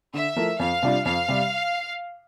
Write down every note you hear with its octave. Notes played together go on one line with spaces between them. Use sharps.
D3 E5
F3 A3 E4 A#4
F2 F5
C3 G3 D4 F4
F2 F5
C3 G3